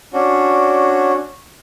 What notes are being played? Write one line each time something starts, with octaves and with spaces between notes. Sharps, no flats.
C#4 D4 F#4